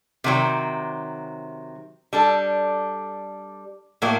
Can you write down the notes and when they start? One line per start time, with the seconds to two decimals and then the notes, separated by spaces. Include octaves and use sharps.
0.24 C3 D#3 F#3
2.13 G3 D4 A4
4.02 A2 F#3 A#3